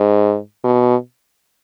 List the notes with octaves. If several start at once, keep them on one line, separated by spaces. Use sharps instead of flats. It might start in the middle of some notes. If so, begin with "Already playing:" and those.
Already playing: G#2
B2